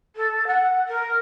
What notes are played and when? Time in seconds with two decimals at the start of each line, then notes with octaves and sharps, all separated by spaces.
0.16 A4
0.47 F#5
0.88 A#4